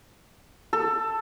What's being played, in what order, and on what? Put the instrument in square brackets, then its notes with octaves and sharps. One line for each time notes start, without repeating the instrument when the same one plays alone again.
[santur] A4